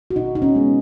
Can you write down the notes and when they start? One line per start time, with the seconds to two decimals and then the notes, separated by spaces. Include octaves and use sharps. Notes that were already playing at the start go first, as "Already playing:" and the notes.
0.11 F#4
0.16 B2 D#4
0.35 D#4
0.42 C#4
0.55 G#3 B3